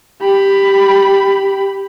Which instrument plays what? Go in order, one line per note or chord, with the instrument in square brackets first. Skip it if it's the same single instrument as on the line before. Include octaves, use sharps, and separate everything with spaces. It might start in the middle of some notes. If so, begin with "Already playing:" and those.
[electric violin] G4 B5